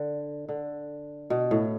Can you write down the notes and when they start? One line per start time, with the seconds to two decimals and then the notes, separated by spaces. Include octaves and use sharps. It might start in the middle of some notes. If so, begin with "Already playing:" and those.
Already playing: D3
0.49 D3
1.30 B2
1.51 A2